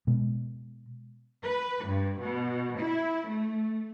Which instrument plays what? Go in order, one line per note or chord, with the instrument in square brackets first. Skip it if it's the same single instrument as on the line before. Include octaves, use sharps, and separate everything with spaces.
[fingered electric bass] B2 G#3
[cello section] B4
G2
B2
E4
A3